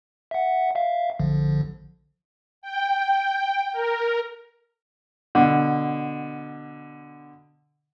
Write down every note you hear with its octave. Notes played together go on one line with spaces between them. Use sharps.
E5 F#5
E5 F5
A#1 D3 F3
G5
A#4
B2 D3